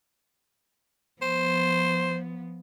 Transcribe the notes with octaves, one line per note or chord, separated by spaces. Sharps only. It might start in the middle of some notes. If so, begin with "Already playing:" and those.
F3 B3 C5